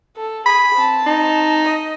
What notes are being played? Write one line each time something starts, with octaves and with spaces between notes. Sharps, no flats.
A4
G#4 B5
C4 A5
D#4
D#5